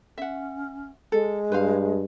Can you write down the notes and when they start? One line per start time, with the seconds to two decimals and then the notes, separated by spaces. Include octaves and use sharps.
0.18 C#4 E5 F#5
1.12 G#3 A4
1.52 G2 B4 C5 F5